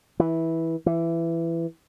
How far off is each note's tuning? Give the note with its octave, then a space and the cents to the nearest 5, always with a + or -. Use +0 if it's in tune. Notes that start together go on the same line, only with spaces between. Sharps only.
E3 -10
E3 +15